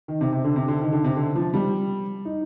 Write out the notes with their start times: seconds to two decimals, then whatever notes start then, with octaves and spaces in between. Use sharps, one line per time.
0.08 D#3
0.21 C3
0.32 C3
0.44 D3
0.56 C3
0.68 D3
0.81 D#3
0.92 D3
1.04 C3
1.16 D3
1.36 F3
1.54 G3
2.25 D#4